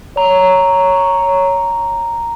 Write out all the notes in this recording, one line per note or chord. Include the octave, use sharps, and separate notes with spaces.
C#5 A#5